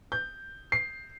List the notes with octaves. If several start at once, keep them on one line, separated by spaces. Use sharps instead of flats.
G6
C7